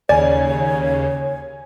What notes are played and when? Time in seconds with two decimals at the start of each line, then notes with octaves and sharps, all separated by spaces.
0.09 D#2 C#3 C#5 D5 G#5